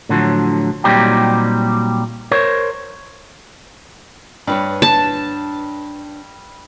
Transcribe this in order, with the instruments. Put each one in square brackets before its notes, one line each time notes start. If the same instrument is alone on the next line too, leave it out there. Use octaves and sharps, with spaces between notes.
[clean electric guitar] A2 D3 F3 F#3
A#2 F#3 G3 C4 D#4 G4
A#4 C5 C#5
[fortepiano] G2 [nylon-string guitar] D4 B4 C#5
[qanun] A5